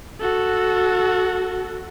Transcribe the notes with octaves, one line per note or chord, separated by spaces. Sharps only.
F#4 A4